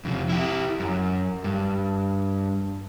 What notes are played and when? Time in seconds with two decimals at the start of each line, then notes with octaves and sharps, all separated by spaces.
0.05 F2 C3
0.29 E4 G4
0.80 F#2
1.44 G2